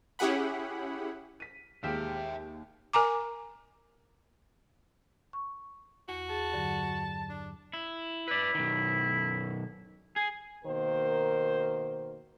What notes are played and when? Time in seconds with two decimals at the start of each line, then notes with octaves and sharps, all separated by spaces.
0.19 C#4 E4 G4 G#4 F#5 B5
1.40 B6 D#7
1.84 D#2 G#3 G4 G#4 E5 F5 G5
2.93 A#4 G#5 A#5 D6
5.33 C#6
6.09 E2 F#4
6.29 G#4 A5
6.52 G2 D3 F#3
7.29 D4
7.73 E4
8.28 E4 B4 D5
8.55 B1 D#3
10.16 G#4 G#5
10.65 B2 D#3 A#3 A#4 C5